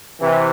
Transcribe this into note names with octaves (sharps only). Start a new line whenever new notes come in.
C3 E3